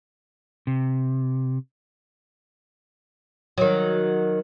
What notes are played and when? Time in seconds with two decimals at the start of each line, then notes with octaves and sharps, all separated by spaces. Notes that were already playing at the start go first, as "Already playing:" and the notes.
0.67 C3
3.58 D#3 F#3